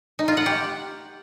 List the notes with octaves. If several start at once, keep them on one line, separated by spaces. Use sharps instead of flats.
D#4
F4
F#5
G4